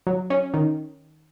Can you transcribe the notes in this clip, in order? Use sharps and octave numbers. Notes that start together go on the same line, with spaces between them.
F#3
C#4
D#3